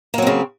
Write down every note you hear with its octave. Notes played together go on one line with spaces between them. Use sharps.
C#3 F#3 A#3 C4